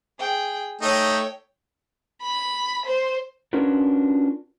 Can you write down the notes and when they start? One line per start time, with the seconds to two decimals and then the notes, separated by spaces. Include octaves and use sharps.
0.18 G#4 G5
0.81 A3 D#4 C#5 G5
2.22 B5
2.86 C5
3.53 C#4 D4 F4 F#4 A#4 B4